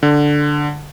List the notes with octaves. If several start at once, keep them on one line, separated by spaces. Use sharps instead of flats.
D3